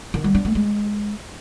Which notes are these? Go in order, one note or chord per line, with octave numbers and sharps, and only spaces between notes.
D#3
G3
D4
A3
G#3